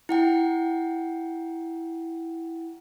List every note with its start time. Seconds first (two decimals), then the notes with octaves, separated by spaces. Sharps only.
0.09 E4 F#5 G5